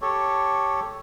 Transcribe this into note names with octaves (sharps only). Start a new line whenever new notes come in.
G4 A4 C#5